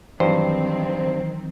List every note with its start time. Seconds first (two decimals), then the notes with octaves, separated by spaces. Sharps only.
0.20 G2 D#3 E3 F#3 C4 C5